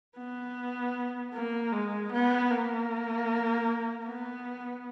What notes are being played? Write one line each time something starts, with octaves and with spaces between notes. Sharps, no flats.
B3
A#3
G#3
B3
A#3
B3